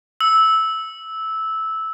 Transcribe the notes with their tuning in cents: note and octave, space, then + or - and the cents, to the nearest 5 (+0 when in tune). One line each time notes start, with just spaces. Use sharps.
E6 -10